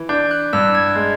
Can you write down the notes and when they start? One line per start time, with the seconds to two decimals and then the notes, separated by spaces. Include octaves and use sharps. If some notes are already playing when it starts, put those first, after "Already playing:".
Already playing: E3
0.09 D4 G6
0.31 F#6
0.53 G2 E6
0.75 G#6
0.95 G#3